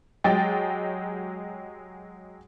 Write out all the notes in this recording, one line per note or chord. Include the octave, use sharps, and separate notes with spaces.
F#3 G#3 G4 G5 A6